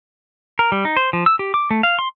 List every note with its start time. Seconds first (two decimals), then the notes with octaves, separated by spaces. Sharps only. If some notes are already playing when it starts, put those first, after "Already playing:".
0.59 A#4
0.72 G3
0.85 D#4
0.97 C5
1.13 F3
1.26 E6
1.39 G4
1.54 D6
1.71 A3
1.83 F5
1.99 C6